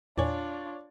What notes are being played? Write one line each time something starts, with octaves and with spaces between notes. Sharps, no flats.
E2 A#2 D4 F4 C#5 D5 G#5